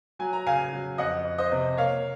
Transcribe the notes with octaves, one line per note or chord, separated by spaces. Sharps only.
F#3 G#5
A#5
C#3 F5 G#5
F#3
F2 D#5 F#5
F2
C5 D#5
C3
A#3 C#5 F5